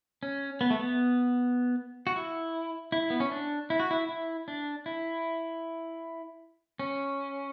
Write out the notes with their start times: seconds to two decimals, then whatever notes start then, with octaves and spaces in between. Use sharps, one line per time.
0.23 C#4
0.61 B3
0.70 A3
0.79 B3
2.07 F#4
2.16 E4
2.92 E4
3.10 B3
3.20 C#4
3.32 D4
3.70 E4
3.80 F#4
3.91 E4
4.09 E4
4.48 D4
4.86 E4
6.80 C#4